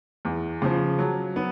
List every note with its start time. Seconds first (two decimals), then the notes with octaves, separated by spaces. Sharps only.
0.25 E2
0.62 C#3 F3
0.99 F#3
1.36 B3